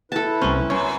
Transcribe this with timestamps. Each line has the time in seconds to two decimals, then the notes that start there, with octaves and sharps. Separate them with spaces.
0.12 E4 A4 B4 A5
0.42 C2 C#4 C5
0.70 F#2 C#5 G#5